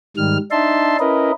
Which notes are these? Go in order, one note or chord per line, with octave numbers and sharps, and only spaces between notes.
G#2 D#3 G3 F6
D4 D#4 E5 A5 C6
C#4 E4 A#4 B4 D#5